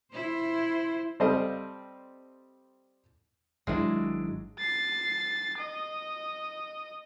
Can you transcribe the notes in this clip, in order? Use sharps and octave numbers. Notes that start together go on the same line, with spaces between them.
E4 C5
G3 C4 A4 C5 D#5 F5
G#1 F#3 G#3 D4 E4
A6 C7
D#5